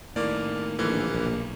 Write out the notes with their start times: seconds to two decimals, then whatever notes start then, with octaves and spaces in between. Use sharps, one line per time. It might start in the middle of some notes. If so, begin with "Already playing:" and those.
0.16 A2 D#3 A#3 D5
0.79 A#1 D3 E3 A#3 E4
1.13 B1